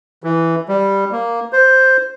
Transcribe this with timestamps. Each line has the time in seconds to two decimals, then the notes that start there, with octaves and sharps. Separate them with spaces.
0.24 E3
0.68 G3
1.12 A#3
1.53 C5